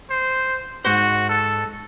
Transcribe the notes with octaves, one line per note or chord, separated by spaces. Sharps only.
C5
G#2 F#4 C5
A4